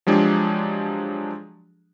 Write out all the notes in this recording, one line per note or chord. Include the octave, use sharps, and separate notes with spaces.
F3 F#3 G#3 D4 G4 G#4